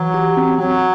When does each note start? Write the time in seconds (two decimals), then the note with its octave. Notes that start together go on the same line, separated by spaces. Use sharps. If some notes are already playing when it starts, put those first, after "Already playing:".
Already playing: E3 F#3
0.14 G4
0.37 C4
0.59 F#3 C4